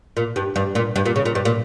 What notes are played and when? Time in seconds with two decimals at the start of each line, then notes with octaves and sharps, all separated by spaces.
0.17 A#2
0.36 G2
0.56 G2
0.75 A#2
0.96 G2
1.06 A#2
1.16 C#3
1.25 A#2
1.35 G2
1.45 A#2